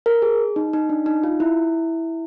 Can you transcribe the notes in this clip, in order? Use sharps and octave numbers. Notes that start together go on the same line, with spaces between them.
A#4
G#4
D#4
D#4
D4
D#4
F4
E4